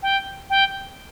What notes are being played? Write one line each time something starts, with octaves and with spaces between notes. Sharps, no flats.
G5
G5